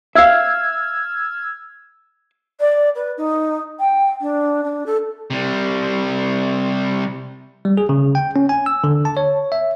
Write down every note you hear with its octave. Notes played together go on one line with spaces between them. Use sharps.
E5 F5 E6 F6 G#6
D5
B4
D#4
G5
D4
D4
A4
C3 G3
G3
G#4
C#3
G5
C#4
G#5
E6
D3
A5
C#5
E5